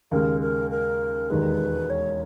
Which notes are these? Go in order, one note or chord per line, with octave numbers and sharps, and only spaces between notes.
D#2 C#3 G#3 A#4
A#4
A#4
E1 D#2 D#3 G#3 B4
C#5